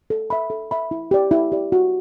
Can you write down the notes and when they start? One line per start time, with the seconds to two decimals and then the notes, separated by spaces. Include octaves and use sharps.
0.10 A4
0.30 E5 B5
0.50 A4
0.71 E5 B5
0.91 E4
1.11 G4 D5
1.31 E4
1.52 G4 D5
1.72 F#4